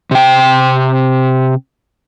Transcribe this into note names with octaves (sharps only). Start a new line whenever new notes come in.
C3 G5